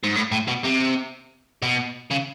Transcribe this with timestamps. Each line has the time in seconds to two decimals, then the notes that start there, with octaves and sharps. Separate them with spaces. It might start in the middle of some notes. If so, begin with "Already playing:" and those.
0.03 G#2
0.15 A2
0.32 A2
0.48 B2
0.64 C3
1.62 B2
2.10 C#3